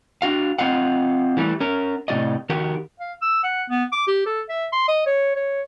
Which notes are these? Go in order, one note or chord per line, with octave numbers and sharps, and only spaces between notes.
D4 F#4 F5
C4 F4 D#5 F5 F#5
E3 G3 A3
C#4 A#4
A2 C3 A#3 F#4 D5 D#5
D#3 F#4 G4 A#4
F5
E6
F#5
B3
D6
G4
A4
E5
C6
D#5
C#5
C#5